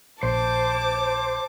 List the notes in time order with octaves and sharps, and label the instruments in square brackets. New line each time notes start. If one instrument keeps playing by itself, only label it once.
[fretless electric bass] A#1 [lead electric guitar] C5 [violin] A5 D6